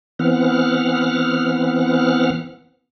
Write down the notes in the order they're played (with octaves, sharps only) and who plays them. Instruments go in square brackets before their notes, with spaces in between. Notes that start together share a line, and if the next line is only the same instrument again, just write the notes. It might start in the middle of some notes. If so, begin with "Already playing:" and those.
[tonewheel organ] E3 B3 C4 F#5 F6